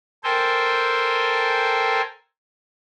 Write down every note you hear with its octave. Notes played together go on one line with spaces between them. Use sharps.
A4 A#4 C5 G5 G#5